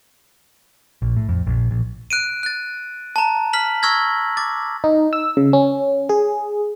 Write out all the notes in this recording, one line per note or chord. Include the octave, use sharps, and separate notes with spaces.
A#1
A2
F2
A#1
A#1
F#6 D7 D#7
F#6 A6
A5 A#5
F6 B6 F#7
C#6 E6 F6 G#6 A#6
D6 A6
D#4
E6
C#3
C#4
G#4